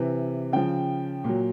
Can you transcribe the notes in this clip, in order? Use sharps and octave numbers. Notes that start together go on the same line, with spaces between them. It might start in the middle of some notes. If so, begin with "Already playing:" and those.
Already playing: C3 E3
C#3 F3 G5
A#2 F#3